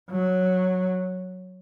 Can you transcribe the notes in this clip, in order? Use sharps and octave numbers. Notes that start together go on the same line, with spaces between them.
F#3